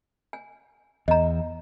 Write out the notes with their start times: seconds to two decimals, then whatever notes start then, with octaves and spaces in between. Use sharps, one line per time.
0.33 G#5
1.08 E2 D#5 A#5